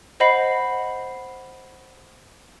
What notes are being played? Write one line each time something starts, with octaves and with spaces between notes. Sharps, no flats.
C5 D#5 F#5 B5 C7